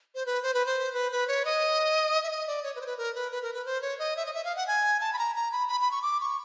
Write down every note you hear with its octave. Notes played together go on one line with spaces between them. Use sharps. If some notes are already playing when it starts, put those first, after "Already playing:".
C5
B4
C5
B4
C5
B4
B4
C#5
D#5
E5
D#5
D5
C#5
B4
C5
B4
A#4
B4
B4
A#4
B4
C5
C#5
D#5
E5
D#5
E5
F5
F#5
G#5
A5
B5
A#5
A#5
B5
B5
B5
C#6
D6
C#6